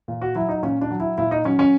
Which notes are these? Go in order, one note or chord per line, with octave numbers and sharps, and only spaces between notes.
A#2
F#4
F#3 E4
D#4
A#2 C#4
D4
F#3
E4
A#2 E4
D#4
F#3 C#4
C#4